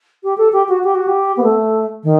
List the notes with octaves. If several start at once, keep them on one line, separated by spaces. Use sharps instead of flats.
G4
A4
G4
F#4
G4
F#4
G4
B3
A3
D#3